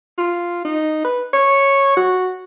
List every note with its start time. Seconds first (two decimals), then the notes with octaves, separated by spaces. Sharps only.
0.18 F4
0.65 D#4
1.05 B4
1.33 C#5
1.97 F#4